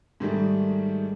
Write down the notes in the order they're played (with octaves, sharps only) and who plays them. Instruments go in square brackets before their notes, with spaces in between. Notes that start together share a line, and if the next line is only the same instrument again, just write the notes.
[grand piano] G#2 D#3 G3 A3